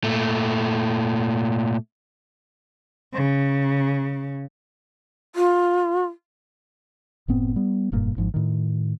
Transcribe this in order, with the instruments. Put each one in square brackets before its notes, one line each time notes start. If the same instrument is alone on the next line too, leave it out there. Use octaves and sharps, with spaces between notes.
[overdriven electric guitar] A#2 A3
[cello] C#3
[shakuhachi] F4
[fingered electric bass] F#1 A2 B3 C4
G3 B3
F1 G2 A#2
G#1 G#2 F3
A2 D#3